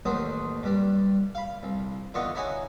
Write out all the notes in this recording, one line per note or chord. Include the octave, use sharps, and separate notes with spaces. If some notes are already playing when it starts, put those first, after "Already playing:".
A1 D#2 F#3 C5 D#6
G2 G3
F5 B5
C2
D3 E3 B3 F4 D#5 C#6
D#4 E4 F#4 C#5 D#5 G#5